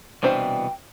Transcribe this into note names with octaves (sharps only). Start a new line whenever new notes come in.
C2 B2 E3 D4 C5 F5 G5